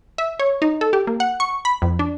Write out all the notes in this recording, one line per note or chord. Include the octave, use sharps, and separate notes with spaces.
E5
C#5
D#4
A4
G4
A#3
F#5
C#6
B5
F2
D4